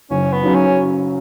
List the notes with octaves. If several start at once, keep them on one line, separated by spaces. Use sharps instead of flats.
F#1 C#4
B3
F#2 C#3 F#3
C#4